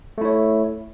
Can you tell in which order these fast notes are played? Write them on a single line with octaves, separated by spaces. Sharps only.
A3 E4 C#5